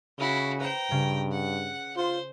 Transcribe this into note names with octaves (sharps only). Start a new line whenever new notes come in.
C#3 E4 F#4
B4 C5 G5 A#5
G2 C#3
F#5
F4 C5